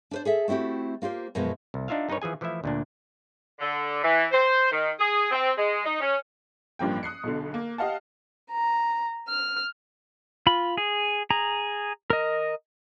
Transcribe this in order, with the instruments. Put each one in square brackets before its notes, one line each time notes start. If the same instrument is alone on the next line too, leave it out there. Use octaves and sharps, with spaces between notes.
[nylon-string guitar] D4 B4 C5
G#4 A4 E5
A3 C4 E4 F#4 G4
A#3 F4 G4 C5
F#2 B2 F3 G#3 B3
[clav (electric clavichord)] C2
D4 D#4 F4 E5 F5
G2 D#4 A#4 B4 C#5
E3 F3 G#4 G#5
E3 F3 A3 E4 E5
D2 A#2 D4
[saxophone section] D3
E3
C5
D#3
G#4
C4
G#3
D#4
C#4
[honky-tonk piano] A1 G2 F3 A#3 G5
D#6 F#6 C7 C#7
B1 B2 D3
A#3
G4 D#5 F5 F#5 A5
[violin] A#5
F6
[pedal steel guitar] F4 B5
G#4
G#4 A#5
A#4 D#5